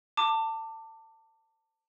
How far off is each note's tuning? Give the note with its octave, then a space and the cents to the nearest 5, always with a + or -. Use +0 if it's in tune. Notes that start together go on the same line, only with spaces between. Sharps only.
A5 +25 D6 +10